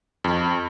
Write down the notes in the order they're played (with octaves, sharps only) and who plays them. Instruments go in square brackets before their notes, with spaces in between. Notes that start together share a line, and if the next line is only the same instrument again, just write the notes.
[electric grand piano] F2